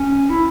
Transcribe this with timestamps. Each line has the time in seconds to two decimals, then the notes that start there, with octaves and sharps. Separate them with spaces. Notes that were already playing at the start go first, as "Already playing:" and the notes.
Already playing: C#4
0.30 E4